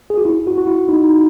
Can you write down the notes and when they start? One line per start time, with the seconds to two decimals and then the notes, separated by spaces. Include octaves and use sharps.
0.10 G#4
0.18 F#4
0.25 E4
0.47 F#4
0.58 F#4
0.67 E4
0.89 D#4